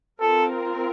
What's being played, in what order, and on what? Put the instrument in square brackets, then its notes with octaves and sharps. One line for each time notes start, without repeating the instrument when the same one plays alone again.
[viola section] C4 F4 A#4 [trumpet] A4